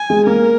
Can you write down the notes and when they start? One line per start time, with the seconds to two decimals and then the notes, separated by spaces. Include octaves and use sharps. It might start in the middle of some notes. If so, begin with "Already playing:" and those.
Already playing: G#5
0.10 G#3
0.27 A#3 A#4